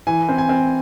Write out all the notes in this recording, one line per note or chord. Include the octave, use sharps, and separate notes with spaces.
E3 G#5
C4
G#5
C4